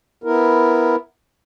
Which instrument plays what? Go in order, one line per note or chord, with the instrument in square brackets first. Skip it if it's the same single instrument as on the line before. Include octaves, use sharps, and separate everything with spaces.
[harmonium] B3 E4 A#4